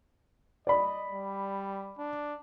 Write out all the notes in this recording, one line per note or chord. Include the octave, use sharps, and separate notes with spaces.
D5 D#5 B5
G3
D4